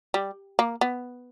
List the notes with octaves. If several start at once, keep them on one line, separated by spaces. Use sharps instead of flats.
G3
A#3
B3